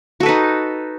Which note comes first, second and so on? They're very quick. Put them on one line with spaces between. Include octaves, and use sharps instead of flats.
F#4 A4 B4 D#4